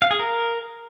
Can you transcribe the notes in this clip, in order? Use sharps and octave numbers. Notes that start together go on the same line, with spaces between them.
F5
G#4
A#4